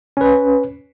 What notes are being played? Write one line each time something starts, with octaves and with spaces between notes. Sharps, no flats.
C#4 B4